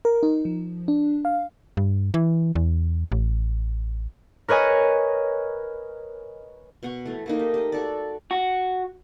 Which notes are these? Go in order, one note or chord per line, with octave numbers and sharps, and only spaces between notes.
A#4
D#4
F3
D4
F5
G2
E3
E2
A1
A#4 B4 C#5 D#5 G#5
B2 F#5 C#6
E3 A3
A3 A#3 D#4
G4
G4 D#5
F#4 A4 D5
F#4